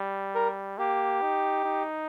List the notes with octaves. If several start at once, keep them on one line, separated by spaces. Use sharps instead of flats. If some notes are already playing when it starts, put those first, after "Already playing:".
Already playing: G3
A#4
A#3 G4
D#4
D#4